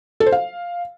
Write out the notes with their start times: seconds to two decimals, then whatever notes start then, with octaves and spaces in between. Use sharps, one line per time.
0.20 A4
0.26 C5
0.32 F5